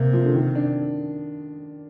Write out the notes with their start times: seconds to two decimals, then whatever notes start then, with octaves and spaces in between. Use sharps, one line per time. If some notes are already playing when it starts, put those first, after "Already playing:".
Already playing: C3 A#3
0.13 F3
0.24 D3
0.34 D#3
0.55 D4